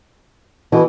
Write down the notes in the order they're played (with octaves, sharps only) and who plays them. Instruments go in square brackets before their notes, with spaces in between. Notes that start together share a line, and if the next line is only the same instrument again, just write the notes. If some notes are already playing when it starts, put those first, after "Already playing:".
[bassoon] B2 [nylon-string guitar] E3